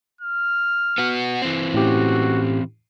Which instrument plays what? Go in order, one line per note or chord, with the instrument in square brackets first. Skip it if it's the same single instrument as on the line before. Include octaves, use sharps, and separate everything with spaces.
[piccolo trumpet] F6
[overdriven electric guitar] B3 F#4
E3 C4
[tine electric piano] A2 C#4 G4 [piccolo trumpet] F#4